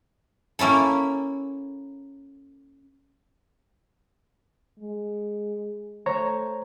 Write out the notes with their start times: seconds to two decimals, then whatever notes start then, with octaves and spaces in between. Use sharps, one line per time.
0.59 A#3 C#4 E4 A4
4.79 G#3
6.06 A3 C5 C#5 A#5